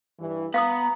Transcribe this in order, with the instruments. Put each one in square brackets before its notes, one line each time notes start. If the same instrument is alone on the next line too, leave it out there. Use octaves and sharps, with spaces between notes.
[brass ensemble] G2 E3
[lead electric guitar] B3 [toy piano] F5 D6 D#6 [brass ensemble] A#5